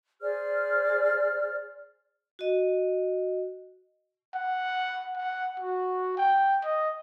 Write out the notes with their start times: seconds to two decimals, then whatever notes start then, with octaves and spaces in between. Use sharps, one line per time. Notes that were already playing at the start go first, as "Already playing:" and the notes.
0.21 G#4 C5 D5 F6
2.39 F#4 D#5
4.34 F#5
5.16 F#5
5.60 F#4
6.17 G5
6.64 D#5